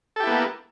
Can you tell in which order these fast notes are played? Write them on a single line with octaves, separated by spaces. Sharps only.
A4 G4 E4 B3 A#3